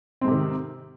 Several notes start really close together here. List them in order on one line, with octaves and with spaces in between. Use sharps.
C4 G#2 C3 D#3